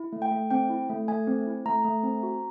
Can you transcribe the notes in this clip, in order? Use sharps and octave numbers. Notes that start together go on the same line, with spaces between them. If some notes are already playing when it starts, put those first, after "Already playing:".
Already playing: E4
A3
G5
A3
C4 G5
E4
A3
A3 G#5
C4
E4
A3 A#5
A3
C4
F#4